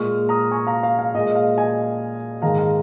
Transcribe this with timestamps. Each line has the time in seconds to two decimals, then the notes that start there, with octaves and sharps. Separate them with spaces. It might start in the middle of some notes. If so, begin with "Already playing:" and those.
Already playing: A#2 G#3 C#6 F6
0.29 A#5 D#6
0.51 G#5 C#6
0.67 F5 A#5
0.83 F5
0.99 F5
1.14 A#2 D#5
1.18 G#3
1.26 D#5
1.35 F5
1.57 D#5 G#5
2.42 G#2 D#3 G#3 F5 A#5
2.58 F5 A#5